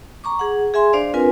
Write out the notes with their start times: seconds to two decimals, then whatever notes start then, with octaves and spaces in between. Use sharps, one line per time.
0.24 A#5 C#6 D6
0.39 G#4 F#5
0.74 G#4 E5 G#5 C6
0.93 D4 C5 D5 F5
1.14 C4 D4 F4 A#4 B4 G#5